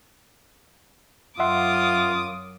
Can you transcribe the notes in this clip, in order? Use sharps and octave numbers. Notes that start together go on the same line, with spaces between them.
F#2 F4 E5 F#5 C6 D6 D#6